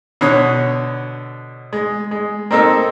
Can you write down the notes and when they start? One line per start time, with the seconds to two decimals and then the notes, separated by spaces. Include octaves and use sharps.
0.21 B2 D3 C#5 D#6
1.73 G#3
2.11 G#3
2.51 A#3 C4 D#4 A4 A#4